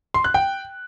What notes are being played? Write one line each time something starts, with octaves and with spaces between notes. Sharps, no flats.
C6
F#6
G5